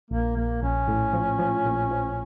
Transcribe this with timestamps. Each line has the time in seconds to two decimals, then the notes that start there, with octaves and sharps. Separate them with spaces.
0.11 A#1 A#3
0.36 A#1 A#3
0.62 A#1 C#4
0.88 A2
1.13 F3
1.39 F3
1.65 A#1
1.91 F3